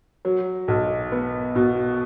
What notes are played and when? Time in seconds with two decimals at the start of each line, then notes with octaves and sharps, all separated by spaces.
0.25 F#3
0.68 B1
1.12 B3
1.55 B2